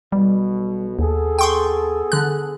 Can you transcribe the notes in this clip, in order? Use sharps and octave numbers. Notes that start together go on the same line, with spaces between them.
B1 B2 G3
D#2 B3 G#4 A4
G5 C6 C#6
D3 F#6